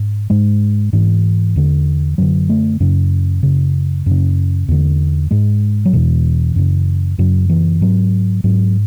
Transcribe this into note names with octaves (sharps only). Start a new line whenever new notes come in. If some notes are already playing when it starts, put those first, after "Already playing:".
Already playing: G#2
G#2 G#3
G#2 E3
E2 D3
F#2 D3 F#3
A3
F#2 C#3 C#4
F#2 C#3
F#2 C#3 C#4
E2 D3
G#2 G#3
F#3
E2 B2 E3
F#2 C#3
F#2 C#3 F#3
E3
G#2 F#3
G#2 F#3